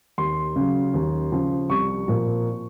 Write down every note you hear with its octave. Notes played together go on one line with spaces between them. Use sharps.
D#2 C6
C#3 F#3
D#2
C#3 F3
C2 C#6
A#2 F3